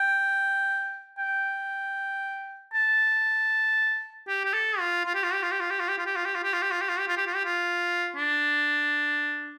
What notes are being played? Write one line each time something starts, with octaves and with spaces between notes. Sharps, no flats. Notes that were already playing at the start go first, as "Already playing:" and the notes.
Already playing: G5
G5
A5
G4
G4
A4
F4
F4
G4
F4
G4
F4
G4
F4
G4
F4
G4
F4
G4
F4
G4
F4
G4
F4
G4
F4
G4
F4
G4
F4
G4
F4
G4
F4
D4